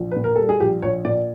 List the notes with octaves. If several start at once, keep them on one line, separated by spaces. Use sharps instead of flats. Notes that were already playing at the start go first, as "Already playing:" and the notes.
Already playing: A#1
A#2 B4
A#4
G3 A4
G#4
A#1 G4
A#1 C#5
A#2 D5